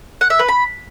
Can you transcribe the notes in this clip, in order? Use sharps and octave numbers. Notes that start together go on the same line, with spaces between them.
F#5
E5
B4
B5